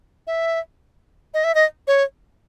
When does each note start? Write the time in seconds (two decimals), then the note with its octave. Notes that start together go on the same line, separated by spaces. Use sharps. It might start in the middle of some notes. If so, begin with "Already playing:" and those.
0.27 E5
1.34 D#5
1.44 E5
1.55 D#5
1.87 C#5